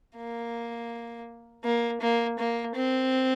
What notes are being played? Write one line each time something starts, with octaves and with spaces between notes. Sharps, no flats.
A#3
A#3
A#3
A#3
C4